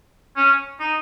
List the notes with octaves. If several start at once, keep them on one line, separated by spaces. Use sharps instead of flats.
C#4
D#4